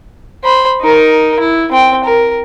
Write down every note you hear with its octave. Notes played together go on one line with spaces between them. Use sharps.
C5 B5
D#4 A#4
E4
C4 G5
A#4